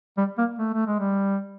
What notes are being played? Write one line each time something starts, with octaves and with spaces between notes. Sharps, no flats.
G3
A#3
A3
A3
G#3
G3